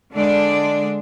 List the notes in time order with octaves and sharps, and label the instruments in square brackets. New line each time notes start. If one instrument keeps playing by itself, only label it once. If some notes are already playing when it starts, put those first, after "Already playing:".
[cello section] D3 G#3 D4 D5